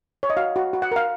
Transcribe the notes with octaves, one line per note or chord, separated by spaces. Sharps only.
C#5
D#5
F#4 F5
F#4
F#4
F#5
A#4 F5